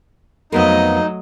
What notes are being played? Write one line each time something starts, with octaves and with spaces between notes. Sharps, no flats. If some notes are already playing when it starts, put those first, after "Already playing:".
F2 F#3 A3 B3 D#4 A#4 D#5